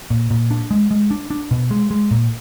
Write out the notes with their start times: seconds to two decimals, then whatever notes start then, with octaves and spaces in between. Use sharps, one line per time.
0.10 A#2
0.31 A#2
0.51 D4
0.71 G#3
0.91 G#3
1.11 D4
1.31 D4
1.51 B2
1.71 G#3
1.91 G#3
2.11 A#2